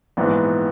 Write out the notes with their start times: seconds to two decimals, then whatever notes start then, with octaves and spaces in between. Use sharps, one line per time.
0.17 A#1 G#2 E3 B3